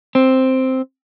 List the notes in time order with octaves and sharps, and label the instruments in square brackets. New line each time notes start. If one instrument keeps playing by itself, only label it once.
[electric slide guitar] C4